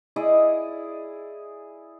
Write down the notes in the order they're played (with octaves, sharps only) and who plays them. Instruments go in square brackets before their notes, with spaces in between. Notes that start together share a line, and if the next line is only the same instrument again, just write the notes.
[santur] E4 G#4 D5 D#5